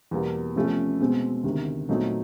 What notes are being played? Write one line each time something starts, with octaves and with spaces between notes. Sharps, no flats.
E2 B2 G3 A#3
C3 F3 A3 C#4
B2 G#3 C4
D2 C3 D#3
A#2 F#3 A3 C4 D#4